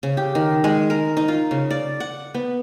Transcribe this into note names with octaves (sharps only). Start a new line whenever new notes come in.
C#3
G4
D#3
G#3
A#4
D#4
F4
C#3
D5
F#5
B3